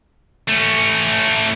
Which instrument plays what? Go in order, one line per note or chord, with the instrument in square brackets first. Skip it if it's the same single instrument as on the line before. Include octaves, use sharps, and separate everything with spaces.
[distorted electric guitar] A3 C#4